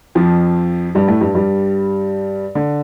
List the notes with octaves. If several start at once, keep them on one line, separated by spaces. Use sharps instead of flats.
F2 F3
G2 G3
A2 A3
G2 G3
G2 G3
D3